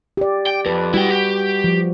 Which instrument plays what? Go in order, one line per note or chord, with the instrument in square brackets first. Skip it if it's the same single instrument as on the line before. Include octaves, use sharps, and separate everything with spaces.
[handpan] G4 D5
[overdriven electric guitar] G5
[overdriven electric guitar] F2 [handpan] B4
[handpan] G3 F#4 [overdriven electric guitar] E4 G5
[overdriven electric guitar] G4
[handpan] F3